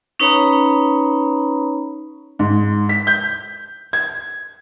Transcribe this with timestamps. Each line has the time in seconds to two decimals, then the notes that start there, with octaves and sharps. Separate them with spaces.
0.20 C#4 D#4 B4 C#5 A#5 B5
2.39 G#2
2.89 B6
3.07 G6
3.93 G#6